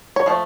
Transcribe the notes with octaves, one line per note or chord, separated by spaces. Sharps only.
C#5
F3 A3